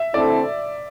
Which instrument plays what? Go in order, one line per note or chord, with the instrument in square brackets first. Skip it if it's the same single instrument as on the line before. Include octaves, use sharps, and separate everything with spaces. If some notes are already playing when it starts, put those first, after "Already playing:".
Already playing: [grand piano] E5
[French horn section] D3 A3 C4 E4 A4 [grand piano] D5